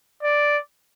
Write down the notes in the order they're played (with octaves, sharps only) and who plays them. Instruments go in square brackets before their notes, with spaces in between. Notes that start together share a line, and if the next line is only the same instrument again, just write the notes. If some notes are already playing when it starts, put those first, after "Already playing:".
[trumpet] D5